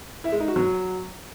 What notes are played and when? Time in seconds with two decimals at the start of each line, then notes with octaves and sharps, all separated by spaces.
0.24 E4
0.32 G#3
0.40 D#4
0.48 F#4
0.56 F#3